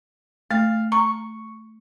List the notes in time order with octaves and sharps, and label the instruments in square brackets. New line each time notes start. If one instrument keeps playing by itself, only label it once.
[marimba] A3 [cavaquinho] F5
[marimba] A#5 [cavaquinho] C#6